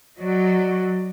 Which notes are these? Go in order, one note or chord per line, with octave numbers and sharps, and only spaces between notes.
F#3 F#4 D5 D#5